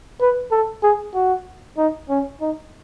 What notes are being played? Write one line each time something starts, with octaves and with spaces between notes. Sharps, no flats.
B4
A4
G#4
F#4
D#4
C#4
D#4